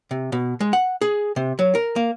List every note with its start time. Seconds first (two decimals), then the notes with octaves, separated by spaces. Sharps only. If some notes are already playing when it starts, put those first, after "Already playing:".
0.11 C3
0.32 B2
0.60 G#3
0.73 F#5
1.01 G#4
1.36 C3
1.59 F#3
1.75 A#4
1.96 A#3